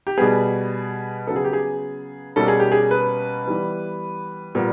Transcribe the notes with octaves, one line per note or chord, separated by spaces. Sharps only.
G4
B2 G3 B3 G#4
C#3 F#3 B3 A4
G#4
G4
G#4
B2 G3 A#3 C#4 A4
G#4
G4
G#4
B4
E3 G3 B3
A#2 G3 B3